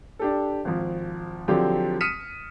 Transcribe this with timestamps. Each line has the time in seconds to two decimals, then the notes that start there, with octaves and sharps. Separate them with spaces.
0.19 D4 G4 A4
0.65 G#1 F3
1.48 D3 F3 F#3 C4 G4
2.01 D#6 F6 B6 C#7 D#7 E7